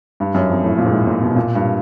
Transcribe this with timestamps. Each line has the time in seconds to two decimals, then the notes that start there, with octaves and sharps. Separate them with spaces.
0.20 G2
0.34 F#2
0.50 F2
0.64 A2
0.78 A#2
0.86 G#2
0.93 A2
1.07 A#2
1.22 B2
1.36 A#2
1.55 G2